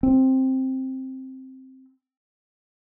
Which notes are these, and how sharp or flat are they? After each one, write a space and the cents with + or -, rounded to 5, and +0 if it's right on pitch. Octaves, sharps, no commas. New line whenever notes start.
C4 +5